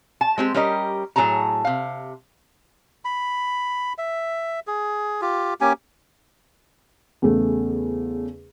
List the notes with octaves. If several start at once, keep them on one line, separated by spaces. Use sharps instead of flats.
A5
G#3 C4 G4
G3 C#4 G4 A#4 D#5
A2 F#3 G#4 A5 A#5
C3 F5
B5
E5
G#4
F4 G4
A#3 C#4 G4 G#5
E2 C#3 A3